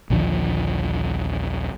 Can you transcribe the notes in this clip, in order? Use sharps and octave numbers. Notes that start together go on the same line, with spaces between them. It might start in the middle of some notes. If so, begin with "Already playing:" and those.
A#1 D#2 D3 F3